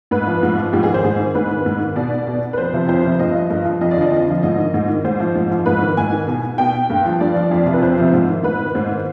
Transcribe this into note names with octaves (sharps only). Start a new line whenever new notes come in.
G#2 B4
F3
G#2
F3
G#2 G4
G#4
D#3
C5
G#2 G#4
D#3
G#2 B4
D#3
G#2
D#3
B2 D5
B2
B4
F2 C5
C3 F3
F2 C5
C3 F3
G2 D#5
F3
G2
F3
F2 D#5
D5
D3 F3 D#5
F2
D3 F3
G#2 D#5
D#3
G#2
D#3
G#2 C5
F3
G#2
F3
G#2 B4
D#3
G#2 G#5
D#3
B2
B2 G5
G2
F3
G2 D5
F3
F2
C3 F3
B4
F2 C5
C3 F3
G#2
D#3
G#2 B4
D#3
G#2 C5
D#3